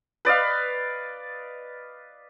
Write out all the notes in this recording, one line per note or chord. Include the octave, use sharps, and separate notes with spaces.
B4 D5 D#5 F5